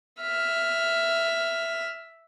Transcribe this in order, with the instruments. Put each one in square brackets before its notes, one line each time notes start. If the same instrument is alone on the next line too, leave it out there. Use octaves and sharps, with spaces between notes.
[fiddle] E5 F6